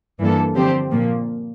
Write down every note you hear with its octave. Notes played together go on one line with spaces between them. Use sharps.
G2 E3 A#3 D4 A4
D3 F3 C4 G4 C5
A#2 F3 A#3